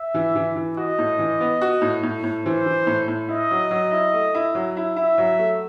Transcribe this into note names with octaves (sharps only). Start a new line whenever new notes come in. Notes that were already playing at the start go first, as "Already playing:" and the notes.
Already playing: E5
E3
E3
E3
F#4 D#5
A2
E3
B3
F#4
A2
A2
A2
E3 C5
E3
A2
A2
E4 D#5
F#3
F#3
E4
A3
E4
F#3
E4
E4 E5
F#3
A3